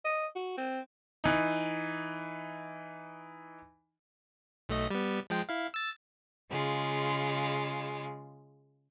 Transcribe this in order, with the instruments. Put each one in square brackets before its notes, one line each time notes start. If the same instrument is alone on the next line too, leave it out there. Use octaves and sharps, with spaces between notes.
[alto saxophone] D#5
F#4
C4
[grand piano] E3 D#4
[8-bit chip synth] B1 A3 D#5
G3 B3
F3 G#3 G5
E4 F5
E6 A6
[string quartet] C#3 G#3 F4